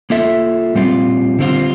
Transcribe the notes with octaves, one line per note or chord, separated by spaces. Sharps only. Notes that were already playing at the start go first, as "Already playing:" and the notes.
A#3 F4 A4 E5
A#2 G3 C4 F4
D3 G3 C4 F4